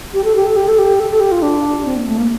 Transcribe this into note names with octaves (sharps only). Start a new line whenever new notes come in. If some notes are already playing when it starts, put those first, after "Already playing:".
G4
A4
G4
A4
G4
A4
G4
A4
A4
G4
F4
D4
C4
A#3
A3
A#3